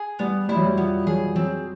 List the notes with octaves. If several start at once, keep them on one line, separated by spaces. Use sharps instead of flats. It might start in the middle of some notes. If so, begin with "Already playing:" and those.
Already playing: G#4
G3 B3
G3 E4
F#3
G3
F3 B3
F#3 G#4
F#3 C4